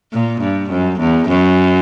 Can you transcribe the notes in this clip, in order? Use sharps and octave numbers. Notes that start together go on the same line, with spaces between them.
A#2
G2
F#2
E2
F#2